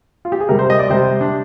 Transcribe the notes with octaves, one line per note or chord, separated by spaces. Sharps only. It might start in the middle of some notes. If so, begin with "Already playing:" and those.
F4
G4
G#4
C3 G3 A#4
C5
D#5
D5
C3 G3 C5
D4